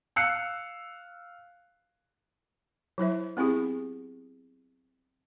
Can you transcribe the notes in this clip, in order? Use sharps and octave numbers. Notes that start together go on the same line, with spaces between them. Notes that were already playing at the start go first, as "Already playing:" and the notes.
F5 E6 F#6 C7 C#7
F#3 E4 C5 E5
B3 C4 E4 G4 G#4